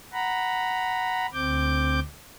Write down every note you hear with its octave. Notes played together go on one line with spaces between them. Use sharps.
F#5 A#5 B5
D2 C4 D6 G6